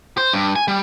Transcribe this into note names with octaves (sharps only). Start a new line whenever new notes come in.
C5
G2
G#5
G3